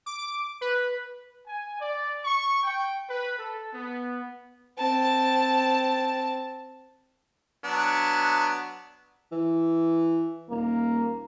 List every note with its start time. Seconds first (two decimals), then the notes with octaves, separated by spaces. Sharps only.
0.06 D6
0.61 B4
1.47 G#5
1.80 D5
2.24 C#6
2.64 G5
3.08 B4
3.38 A4
3.73 B3
4.78 C4 A5
7.64 F#3 B3 D4
9.31 E3
10.50 D#1 A#3